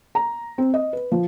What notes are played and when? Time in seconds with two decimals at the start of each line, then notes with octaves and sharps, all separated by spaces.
0.15 A#5
0.58 C4
0.74 D#5
0.93 B4
1.12 F3